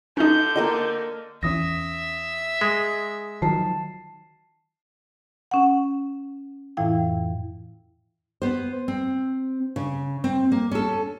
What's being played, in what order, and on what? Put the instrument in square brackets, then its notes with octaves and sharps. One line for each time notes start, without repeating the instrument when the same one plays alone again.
[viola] D3 [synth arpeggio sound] C#4 D#4 [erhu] G6
[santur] A#3 A#4 D#5
[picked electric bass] E2 E3 C#4 [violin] E5 [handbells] D#6 A#6
[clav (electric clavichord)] G#3 [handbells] G#4
[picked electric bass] D#3 F3 F#3 [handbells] A5 C7
[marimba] C#4 F#5
F2 A2 E3 E4 F5 G5
[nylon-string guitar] B3 C5
C4
C#3
C4
A#3
C#4 A4